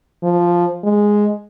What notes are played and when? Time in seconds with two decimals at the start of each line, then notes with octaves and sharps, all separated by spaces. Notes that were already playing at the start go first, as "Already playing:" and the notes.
0.23 F3
0.84 G#3